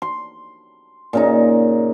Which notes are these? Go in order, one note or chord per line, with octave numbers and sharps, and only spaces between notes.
C6
A#2 C#3 D#4